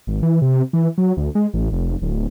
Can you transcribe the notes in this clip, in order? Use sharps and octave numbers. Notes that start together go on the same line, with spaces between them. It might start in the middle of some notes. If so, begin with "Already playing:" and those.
G#1
E3
C3
E3
F#3
D2
G#3
A1
F1
D1